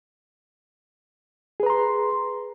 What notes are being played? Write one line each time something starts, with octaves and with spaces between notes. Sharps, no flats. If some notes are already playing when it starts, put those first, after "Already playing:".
G#4 B4 A#5 C6